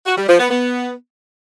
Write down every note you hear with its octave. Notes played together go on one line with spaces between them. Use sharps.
F#4
G3
F3
B3
B3